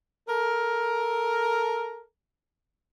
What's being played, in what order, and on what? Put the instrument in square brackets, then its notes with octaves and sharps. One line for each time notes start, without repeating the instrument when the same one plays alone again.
[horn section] A4 A#4